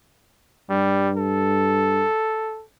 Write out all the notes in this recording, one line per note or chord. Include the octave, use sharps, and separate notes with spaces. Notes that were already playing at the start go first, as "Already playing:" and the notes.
G2 G3
A4